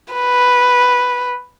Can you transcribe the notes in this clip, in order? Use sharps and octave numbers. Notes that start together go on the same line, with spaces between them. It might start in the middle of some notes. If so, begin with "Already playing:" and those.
B4